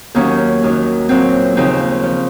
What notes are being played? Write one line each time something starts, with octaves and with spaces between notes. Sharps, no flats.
D#2 D#3 F#3 A#3 C#4
F#2 D#3 F#3
A#2 F#3 C4
D#2 C#3 F3 C4 D#4
F3